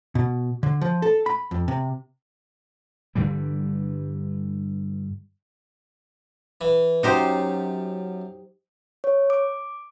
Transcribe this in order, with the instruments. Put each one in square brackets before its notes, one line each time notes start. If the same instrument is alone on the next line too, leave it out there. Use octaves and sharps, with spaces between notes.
[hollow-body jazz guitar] B2
D3
F3
A4
B5
F2
C3
[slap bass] G2 D3 E3 G3
[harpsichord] E3
[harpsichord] F#2 [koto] D#4 G4 C5
[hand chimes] C#5
D6